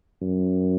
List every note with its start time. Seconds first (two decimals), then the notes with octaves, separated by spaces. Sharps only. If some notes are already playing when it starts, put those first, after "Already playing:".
0.22 F#2